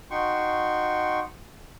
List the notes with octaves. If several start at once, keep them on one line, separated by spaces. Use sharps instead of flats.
D#4 F#4 G5 C6 C#6